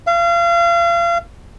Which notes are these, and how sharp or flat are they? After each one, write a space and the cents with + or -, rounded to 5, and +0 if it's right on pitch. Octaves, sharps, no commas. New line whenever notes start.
F5 -35